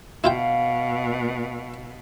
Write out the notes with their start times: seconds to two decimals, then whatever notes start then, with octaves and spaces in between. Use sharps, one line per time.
0.24 B2 E4 F4 F5 G5